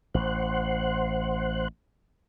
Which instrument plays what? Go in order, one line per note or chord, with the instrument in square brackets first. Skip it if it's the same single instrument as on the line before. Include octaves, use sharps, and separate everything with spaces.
[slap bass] A1 [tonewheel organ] C5 F#5